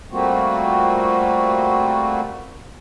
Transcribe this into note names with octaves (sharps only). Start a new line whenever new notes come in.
G3 A3 A#3 C4 F4 F#4